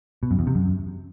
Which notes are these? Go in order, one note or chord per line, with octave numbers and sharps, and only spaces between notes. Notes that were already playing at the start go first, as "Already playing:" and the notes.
B2
F#2
E2
C3
F#2